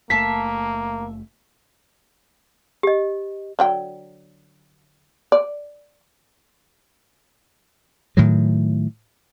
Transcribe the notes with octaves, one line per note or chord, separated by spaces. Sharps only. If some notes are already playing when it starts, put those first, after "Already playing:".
F#1 A3 A#3 E5 F5 A5 B6
G4 D#5
D3 F#3 G5
D5
A2 D#3 F#3